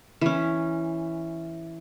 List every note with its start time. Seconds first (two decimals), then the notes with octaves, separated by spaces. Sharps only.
0.21 E3 C#4